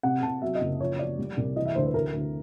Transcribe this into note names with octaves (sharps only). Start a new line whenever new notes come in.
C3 F#5
C3 A5
F#3 E5
D#5
F#1
F3 C#5
F3 D5
G3
C2
E3 D#5
E5
D2 C5
B4
D2 A#4
D2